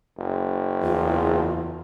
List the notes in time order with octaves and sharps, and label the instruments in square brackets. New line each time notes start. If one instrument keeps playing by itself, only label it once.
[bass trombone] F#1
[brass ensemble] E2 [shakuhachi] F4